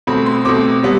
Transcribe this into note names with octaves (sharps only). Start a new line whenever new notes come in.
B2 A3 C4 B5
C6
B2 A3 C4 D6
C3 G3 B3